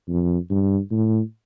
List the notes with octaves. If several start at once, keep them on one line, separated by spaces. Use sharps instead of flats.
F2
G2
A2